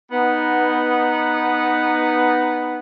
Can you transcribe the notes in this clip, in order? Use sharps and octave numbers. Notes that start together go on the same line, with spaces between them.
B3 D#4